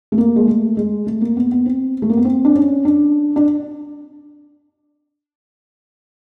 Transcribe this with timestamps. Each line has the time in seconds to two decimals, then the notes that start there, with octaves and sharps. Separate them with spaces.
0.12 A3
0.18 A#3
0.36 G#3
0.47 A3
0.77 G#3
1.07 A3
1.21 A#3
1.37 B3
1.52 B3
1.66 C4
2.02 A3
2.10 A#3
2.17 B3
2.25 C4
2.45 D4
2.56 C#4
2.85 D4
3.36 D4